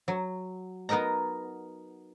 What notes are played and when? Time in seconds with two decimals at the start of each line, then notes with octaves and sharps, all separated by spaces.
0.08 F#3
0.89 B3 D#4 A#4 D#5 A#5